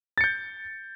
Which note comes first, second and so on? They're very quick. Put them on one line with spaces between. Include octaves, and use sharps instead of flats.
A6 C#7 G6